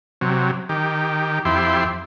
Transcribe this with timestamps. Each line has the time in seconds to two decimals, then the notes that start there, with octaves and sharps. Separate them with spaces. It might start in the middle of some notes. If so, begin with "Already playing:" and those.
0.21 C3 F#3
0.69 D#3 G4
1.45 F2 E4 G4 C6